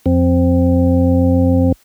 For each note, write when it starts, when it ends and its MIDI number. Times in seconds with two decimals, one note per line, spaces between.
0.06 1.72 41
0.06 1.72 60